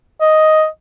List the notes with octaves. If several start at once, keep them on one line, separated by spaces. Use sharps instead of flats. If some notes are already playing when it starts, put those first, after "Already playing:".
D#5